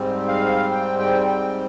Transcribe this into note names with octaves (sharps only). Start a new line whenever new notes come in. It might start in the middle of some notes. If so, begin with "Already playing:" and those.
Already playing: G#2 G3 C4
F5
G5
G5
G5